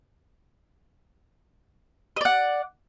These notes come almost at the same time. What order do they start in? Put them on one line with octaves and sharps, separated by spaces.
D#5 D5 F#5